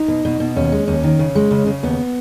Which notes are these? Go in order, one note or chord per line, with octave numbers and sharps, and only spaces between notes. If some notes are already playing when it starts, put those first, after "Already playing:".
Already playing: D#4
B2
B2
B2
D#2 C#4
G#3
D#2 C#4
D#3
C#3
G#3
C#3
C#3
D#2 B3